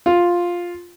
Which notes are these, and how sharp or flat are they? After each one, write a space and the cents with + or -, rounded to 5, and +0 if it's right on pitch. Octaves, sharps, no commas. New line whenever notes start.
F4 +5